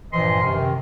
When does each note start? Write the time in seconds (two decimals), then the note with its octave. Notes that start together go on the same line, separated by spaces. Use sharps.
0.12 G2 A#2 E3 F3 D#5 C6
0.42 F#2 C3 D#3